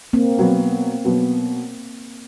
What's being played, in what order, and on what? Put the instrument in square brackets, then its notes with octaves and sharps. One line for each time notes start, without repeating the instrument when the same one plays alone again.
[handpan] A#3 C4
[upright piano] B2 F#3 B3
B2 F#3 B3